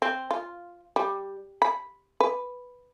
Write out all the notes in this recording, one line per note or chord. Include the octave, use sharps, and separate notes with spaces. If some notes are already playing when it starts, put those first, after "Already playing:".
C4
F4
G3
B5
B4